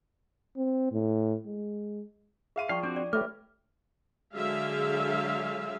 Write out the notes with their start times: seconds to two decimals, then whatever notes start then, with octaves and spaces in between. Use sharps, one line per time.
0.57 C4
0.92 A2
1.46 G#3
2.56 G#4 E5 F5 C6 D#7
2.69 F3 D5 F5 G5 C#6
2.83 C4 D4 F#4 D6
2.96 D5
3.13 A3 G4 B4 C#5 E5 D6 F6
4.34 D3 F#3 G#3 G#4 E5 F5